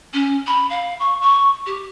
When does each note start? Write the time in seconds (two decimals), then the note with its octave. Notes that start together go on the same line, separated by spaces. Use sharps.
0.13 C#4
0.46 B5
0.70 F5
0.99 C#6
1.21 C#6
1.66 G4